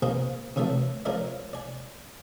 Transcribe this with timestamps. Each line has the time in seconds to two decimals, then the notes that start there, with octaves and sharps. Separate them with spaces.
0.02 B2 D#3 A#3 G#4 B4 C5
0.56 C3 D#3 E3 F#3 A3
1.05 F3 G#3 C#4 A#4 D5 D#5
1.53 D5 G#5